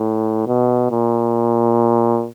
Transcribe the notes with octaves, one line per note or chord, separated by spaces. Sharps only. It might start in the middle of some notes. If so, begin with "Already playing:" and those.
Already playing: A2
B2
A#2